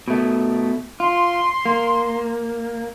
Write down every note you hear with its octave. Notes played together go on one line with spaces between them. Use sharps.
B2 A3
F4 C6
A#3